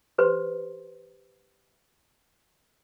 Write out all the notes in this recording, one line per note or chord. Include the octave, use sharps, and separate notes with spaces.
G4 B4 C5 C6